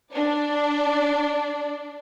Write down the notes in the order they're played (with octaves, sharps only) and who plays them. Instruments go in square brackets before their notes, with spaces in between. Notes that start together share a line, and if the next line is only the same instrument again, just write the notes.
[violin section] D4 D5